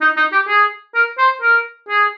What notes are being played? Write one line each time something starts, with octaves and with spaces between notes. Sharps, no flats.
D#4
D#4
G4
G#4
A#4
C5
A#4
G#4